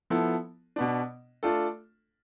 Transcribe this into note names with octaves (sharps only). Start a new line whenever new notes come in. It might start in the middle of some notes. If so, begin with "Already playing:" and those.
F3 B3 E4 A4
B2 B3 D4
A3 D4 F4 A4